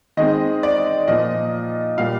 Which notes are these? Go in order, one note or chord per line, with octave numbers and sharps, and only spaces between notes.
D#3 G#3 C4 D#5
D5
A#2 F3 A#3 D#5
A#2 G3 A#3 F5